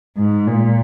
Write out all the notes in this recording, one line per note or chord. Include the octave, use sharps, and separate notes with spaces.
G#2
A#2